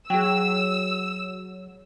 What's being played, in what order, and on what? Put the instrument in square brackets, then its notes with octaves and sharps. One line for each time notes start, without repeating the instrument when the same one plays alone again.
[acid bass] F#3 [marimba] G#4 G5 [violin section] E6